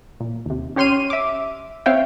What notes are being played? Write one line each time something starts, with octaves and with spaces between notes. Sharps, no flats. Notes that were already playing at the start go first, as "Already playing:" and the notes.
A#2
D#2 C3
C#4 G4 C#5 C6 F6 D#7
E5 D6
C4 C#5 E5 F5 G5